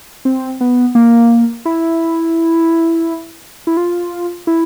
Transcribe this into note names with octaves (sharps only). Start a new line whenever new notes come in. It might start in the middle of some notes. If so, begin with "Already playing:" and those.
C4
B3
A#3
E4
E4
F4
E4